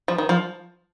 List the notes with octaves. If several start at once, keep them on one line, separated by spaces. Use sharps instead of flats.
F3
D#3
F3